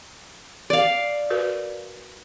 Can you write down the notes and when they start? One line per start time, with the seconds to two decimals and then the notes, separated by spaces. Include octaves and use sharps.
0.70 D5 F5
1.30 F#4 A#4 B4